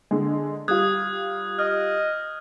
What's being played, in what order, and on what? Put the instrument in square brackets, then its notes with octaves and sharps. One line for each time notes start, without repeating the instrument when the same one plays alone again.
[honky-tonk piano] D3 G#3
[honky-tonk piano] G3 F4 [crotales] D#6 F#6 G#6
[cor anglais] D#5 [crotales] F6